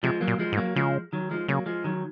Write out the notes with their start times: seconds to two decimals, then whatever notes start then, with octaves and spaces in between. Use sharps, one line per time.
0.03 C3 F3 G#3
0.21 F#3 A#3
0.27 A#2
0.39 F3 G#3
0.52 G#2
0.57 F#3 A#3
0.76 C#3 F3 G#3
1.13 D#3 F#3
1.31 F3 G#3
1.48 C#3 F#3 A#3
1.66 F3 G#3
1.84 D#3 F#3